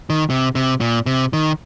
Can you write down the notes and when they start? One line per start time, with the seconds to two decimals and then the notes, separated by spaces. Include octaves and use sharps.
0.10 D#3
0.30 C3
0.55 C3
0.80 A#2
1.06 C3
1.33 D#3